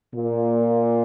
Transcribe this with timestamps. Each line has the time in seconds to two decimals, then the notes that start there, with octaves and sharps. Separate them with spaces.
0.15 A#2